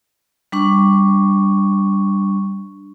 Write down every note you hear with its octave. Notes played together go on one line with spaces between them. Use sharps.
G3 D4 C#6